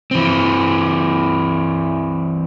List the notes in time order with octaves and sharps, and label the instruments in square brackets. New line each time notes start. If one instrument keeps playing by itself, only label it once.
[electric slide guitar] E3 C4